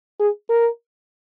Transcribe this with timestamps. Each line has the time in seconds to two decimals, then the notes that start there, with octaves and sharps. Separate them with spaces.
0.20 G#4
0.50 A#4